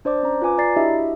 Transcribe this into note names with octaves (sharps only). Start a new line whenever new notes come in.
D4 C5 D5 D6
C#4 A#5
F4 B4 G#5 D6
D5 A#5 A6 C7
D4 E4 F#4 G4 D#5 E5